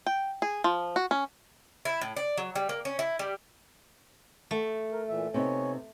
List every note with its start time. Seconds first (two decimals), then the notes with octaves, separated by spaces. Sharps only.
0.06 G5
0.42 G#4
0.64 F3
0.96 F#4
1.11 C#4
1.85 E4
2.01 A2
2.16 D5
2.37 F#3
2.55 G3
2.69 A#3
2.85 C#4
2.99 E4
3.19 G3
4.51 A3
4.93 A#4
5.08 A#2 E3 E5
5.34 C3 B3 D#4 C#5 G#5